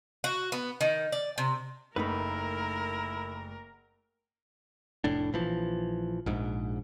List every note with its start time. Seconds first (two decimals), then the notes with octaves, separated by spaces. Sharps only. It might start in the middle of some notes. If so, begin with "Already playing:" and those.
0.24 F#4
0.52 B3
0.81 D#3
1.12 D5
1.38 C3
1.96 F#1 A3 D#4 E4 A#4 B4
5.04 F1 A2 D4
5.33 A#1 E3 F3
6.26 A#1 G#2